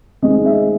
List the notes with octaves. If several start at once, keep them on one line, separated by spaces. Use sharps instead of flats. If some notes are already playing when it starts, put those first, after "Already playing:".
D#3 G#3 C4 D#5
E5